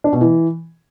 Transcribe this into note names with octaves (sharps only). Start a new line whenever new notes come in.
D4
B2
E3